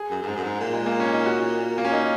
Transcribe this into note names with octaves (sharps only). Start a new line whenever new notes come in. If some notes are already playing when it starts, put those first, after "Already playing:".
Already playing: G#4
F#2
F#2
G#2
F#2
G#2
A#2
G#3
A#3
C#4
D#4
F#4
A#3
C#4
D#4